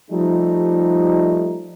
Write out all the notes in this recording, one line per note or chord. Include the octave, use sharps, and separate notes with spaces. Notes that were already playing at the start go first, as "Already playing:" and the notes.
F3 G3 A3 D#4